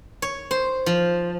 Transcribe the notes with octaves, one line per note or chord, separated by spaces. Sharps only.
C#5
C5
F3